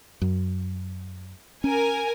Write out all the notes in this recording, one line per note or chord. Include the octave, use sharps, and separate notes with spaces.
F#2
C#4 A#4 G#5